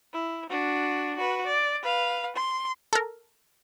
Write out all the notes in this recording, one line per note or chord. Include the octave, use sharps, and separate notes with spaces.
E4
D4 F#4
F#4 B4
D5
B4 F5
C6
A4 A#4